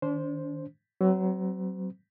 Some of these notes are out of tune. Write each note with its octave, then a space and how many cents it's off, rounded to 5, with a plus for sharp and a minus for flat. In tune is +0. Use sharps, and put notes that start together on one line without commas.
D#3 +0 D4 -35 C5 +0
F#3 +25 C4 +0 C5 -40